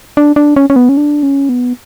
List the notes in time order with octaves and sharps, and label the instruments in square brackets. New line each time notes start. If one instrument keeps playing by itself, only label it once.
[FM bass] D4
D4
C#4
C#4
B3
C#4
D4
C#4
B3